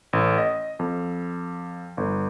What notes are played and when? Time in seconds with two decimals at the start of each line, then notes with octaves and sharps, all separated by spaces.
0.13 A1
0.38 D#5
0.79 F2
1.97 G1